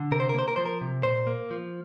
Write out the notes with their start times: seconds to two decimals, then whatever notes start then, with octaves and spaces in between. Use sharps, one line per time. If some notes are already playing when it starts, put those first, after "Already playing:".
Already playing: D3
0.12 C3 A#4
0.20 C5
0.29 A#4
0.34 A#3 C5
0.48 A#4
0.56 F3 C5
0.66 A#4
0.81 C3
1.03 A#2 C5
1.27 A#3
1.51 F3